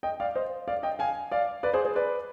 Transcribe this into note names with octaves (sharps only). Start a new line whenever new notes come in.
D#5 G5
D5 F5
C5 D#5
D5 F5
D#5 G5
F5 G#5
D5 F5
B4 D5
G#4 C5
G#4 C5
B4 D5